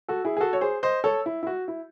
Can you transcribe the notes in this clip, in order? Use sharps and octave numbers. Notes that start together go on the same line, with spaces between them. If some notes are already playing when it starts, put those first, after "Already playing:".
F#4 A4
E4 G#4
G#4
F#4 A4
C#5
G#4 C5
C5 D#5
A4 C#5
E4
E4
F#4
E4